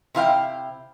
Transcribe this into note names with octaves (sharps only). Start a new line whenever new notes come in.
C3 E4 F5 G5